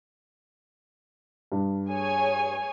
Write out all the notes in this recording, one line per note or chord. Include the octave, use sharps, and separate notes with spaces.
G2
G#4 C#5 G#5